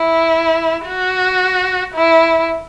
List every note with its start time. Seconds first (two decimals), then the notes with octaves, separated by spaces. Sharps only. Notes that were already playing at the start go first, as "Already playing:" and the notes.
Already playing: E4
0.87 F#4
1.95 E4